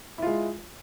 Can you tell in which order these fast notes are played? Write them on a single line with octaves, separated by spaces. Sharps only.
E4 F4 G#3